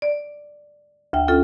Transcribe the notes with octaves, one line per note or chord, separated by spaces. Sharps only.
D5
D2 E5 G5
C#4 F4 A4